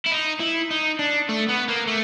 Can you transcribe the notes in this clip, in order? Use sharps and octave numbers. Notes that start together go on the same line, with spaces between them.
E4
D#4
E4
D#4
D4
A3
B3
A#3
A3